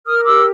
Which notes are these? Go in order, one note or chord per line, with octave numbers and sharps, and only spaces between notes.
A#4 D#6 F6
D#6
G4 D6 E6